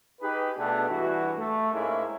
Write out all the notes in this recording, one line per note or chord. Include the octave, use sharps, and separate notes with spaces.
D#4 G4 G#4 B4
B2 A3 B3 D4 G#4
G2 E3 E4 F#4
A3
G#2 G#3 A#3 C#4 E4